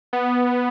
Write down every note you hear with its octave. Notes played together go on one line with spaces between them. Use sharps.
B3